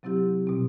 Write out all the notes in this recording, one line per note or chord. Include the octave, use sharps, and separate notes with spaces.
C3 F#3 C4 E4 G4
B2 G3 C4